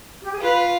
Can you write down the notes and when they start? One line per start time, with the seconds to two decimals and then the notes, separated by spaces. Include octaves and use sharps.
0.23 G4
0.32 G#4
0.40 F4 B4